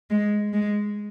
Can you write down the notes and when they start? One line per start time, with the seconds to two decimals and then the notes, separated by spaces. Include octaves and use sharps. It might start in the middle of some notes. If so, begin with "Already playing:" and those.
0.10 G#3
0.53 G#3